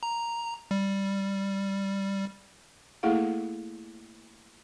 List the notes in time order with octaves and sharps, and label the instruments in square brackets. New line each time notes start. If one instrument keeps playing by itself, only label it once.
[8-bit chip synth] A#5
G3
[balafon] A3 A#3 E4 G#4 A4 F5